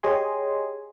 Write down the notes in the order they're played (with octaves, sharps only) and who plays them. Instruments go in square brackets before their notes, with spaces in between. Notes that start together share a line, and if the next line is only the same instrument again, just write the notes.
[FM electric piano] G4 G#4 C#5 D#5 G#5 C6